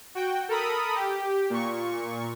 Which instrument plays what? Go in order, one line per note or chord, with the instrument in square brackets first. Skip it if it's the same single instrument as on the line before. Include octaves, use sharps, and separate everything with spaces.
[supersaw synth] F#4 G5
A4 A#4 B5 D#6
G4
A#2 C#6